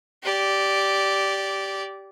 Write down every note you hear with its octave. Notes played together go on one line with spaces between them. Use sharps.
G4 D5